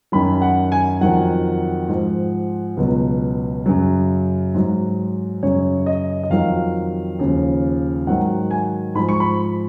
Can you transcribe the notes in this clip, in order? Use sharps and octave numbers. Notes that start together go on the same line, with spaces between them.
F#2 D#3 F#3 B5
F#5
G#5
F2 D#3 F#3 F#5
G#2 F3
C#2 B2 F#3
F#2 C#3 F#3
G#2 F#3
F#2 C#3 F#3 C#5
D#5
D#5
F2 D#3 F#3 F5
D#2 C#3 F3
G#2 D#3 F#3 F#5
G#5
G#2 F3 B5
C#6
B5